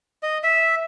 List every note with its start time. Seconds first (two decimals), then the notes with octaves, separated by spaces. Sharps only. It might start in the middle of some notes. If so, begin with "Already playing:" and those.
0.23 D#5
0.44 E5